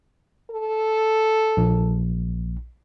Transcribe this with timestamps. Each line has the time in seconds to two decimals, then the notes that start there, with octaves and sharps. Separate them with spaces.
0.51 A4
1.57 A#1